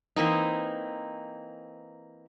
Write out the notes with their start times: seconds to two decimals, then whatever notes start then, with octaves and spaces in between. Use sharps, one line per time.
0.16 E3 A#3 C4 D#4